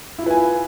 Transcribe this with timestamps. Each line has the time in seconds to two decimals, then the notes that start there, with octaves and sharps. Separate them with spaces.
0.18 E4
0.22 F4
0.26 B4
0.30 G#5